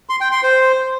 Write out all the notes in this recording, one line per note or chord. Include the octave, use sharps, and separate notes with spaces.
C6
G5
C6
C5